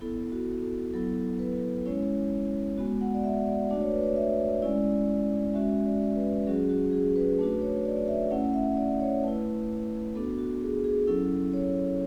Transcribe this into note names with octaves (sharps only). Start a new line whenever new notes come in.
B3 E4 A4
F#4
A4
F#3 B3 E4 A4
B4
G#3 C#4 E4 C#5
G#3 B3 F#4
F#5
D5
E5
D5
A3 D4 F#4 D5
C#5
B4
C#5
E5
G#3 C#4 E4 D5
G#3 C#4 F#4 E5
D5
B4
F#3 C#4 F#4 G#4
F#4
G#4
B4
A3 D4 F#4 B4
C#5
D5
D5
E5
A3 C#4 E4 F#5
E5
D5
C#5
A3 E4 B4
B3 D4 F#4 A4
F#4
G#4
G#4
F#3 C#4 E4 A4
C#5